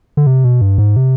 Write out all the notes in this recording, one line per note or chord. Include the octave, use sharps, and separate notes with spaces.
D3
C3
B2
G2
G#2
C3